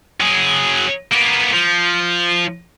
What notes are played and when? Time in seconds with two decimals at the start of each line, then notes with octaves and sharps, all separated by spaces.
0.21 F#3 G#4
1.12 A#3 B3
1.53 F3